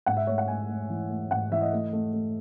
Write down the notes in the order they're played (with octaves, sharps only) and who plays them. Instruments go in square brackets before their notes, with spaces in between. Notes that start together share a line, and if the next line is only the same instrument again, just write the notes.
[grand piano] G#2 F#5
E5
A3 C#5
F#5
A3 G#5
A3
E3
A3
G#2 F#5
E3 E5
D#5
A3
A3
A3